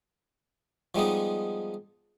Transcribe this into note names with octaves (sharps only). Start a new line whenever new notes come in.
F3 G3 G#3 B3 D#4